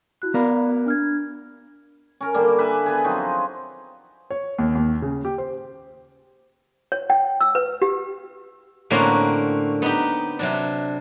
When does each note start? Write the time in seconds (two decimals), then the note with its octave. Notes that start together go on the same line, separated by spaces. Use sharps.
0.22 E4 F#4 F#6
0.34 B3 A#4 D5 F5 B5
0.86 D4 F6 G#6
2.21 C#4 A#4
2.34 D3 G3 A#3
2.59 B4 E5 G#5
2.86 B3 G#4
3.04 F3 F#3 C4 D#4
4.30 C#5
4.59 D#2
4.75 D#2
5.02 C#3
5.25 G4
5.38 C5
6.92 C#5
7.10 G5
7.41 E6
7.55 B4
7.82 G4
8.90 A2 D3 A#3 C4 C#4 F#4
9.82 B3 D#4 G4
10.39 C3 F#3 D4